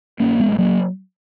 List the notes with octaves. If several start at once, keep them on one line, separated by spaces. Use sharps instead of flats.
A#1 A#3 C#4
G#3 B3
A#1
G#3
F#3 A#3